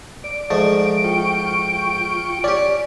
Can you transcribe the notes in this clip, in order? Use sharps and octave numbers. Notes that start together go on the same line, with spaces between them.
D5 D7
G#2 F3 A3
F4 G5 C#6
C#4 G4 D5